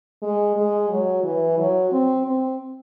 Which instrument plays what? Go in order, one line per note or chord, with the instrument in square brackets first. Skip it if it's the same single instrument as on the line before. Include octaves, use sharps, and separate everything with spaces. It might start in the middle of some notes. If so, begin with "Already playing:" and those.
[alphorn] G#3
G#3
F#3
E3
F#3
C4
C4